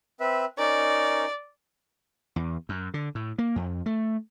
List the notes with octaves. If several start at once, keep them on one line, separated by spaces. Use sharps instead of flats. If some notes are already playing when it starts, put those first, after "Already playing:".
C4 B4 E5
C#4 D#4 A#4 D5
E2
F#2
D3
A2
A#3
F2
A3